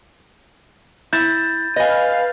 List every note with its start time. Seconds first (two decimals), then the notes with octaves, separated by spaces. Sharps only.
1.13 E4 G6 A6
1.76 B4 D#5 F5 G#5